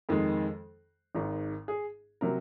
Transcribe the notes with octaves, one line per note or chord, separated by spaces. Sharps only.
F2 D#3 G#3
G#1 G#2 D#3
G#4
C3 F#3 A#4